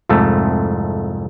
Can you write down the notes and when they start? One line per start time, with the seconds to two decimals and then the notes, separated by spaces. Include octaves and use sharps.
0.09 C2 F2 G#2 A3